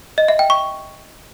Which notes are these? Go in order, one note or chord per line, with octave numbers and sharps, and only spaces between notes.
D#5
E5
G5
C#6